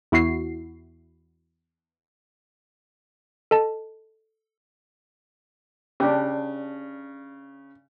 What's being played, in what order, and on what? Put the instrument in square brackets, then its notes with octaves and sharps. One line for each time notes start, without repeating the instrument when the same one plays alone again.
[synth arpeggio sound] E2 E4 F#4 C7
[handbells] A4 D#5 A5
[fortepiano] C#3 [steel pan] D4 G4